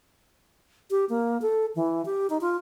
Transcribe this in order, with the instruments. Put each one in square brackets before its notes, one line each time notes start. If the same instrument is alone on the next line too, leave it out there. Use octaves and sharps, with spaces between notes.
[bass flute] G4
A#3
A4
E3
G4
D#4
F4